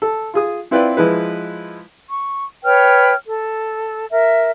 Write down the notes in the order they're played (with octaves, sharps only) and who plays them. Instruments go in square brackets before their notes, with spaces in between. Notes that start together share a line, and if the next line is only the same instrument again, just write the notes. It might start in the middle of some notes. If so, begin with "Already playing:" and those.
[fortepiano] A4
F4 G#4 D#6
C4 E4 F4 B4 D5 G5
F3 G#3 E4 B4
[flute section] C#6
B4 C#5 G5 F6
A4
A#4 E5